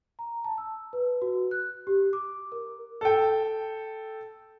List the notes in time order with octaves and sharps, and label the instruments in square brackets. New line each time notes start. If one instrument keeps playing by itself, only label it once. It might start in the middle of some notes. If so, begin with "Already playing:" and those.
[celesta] A#5
A5
E6
B4
F#4
F#6
G4
D6
A#4
[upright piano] A4 G5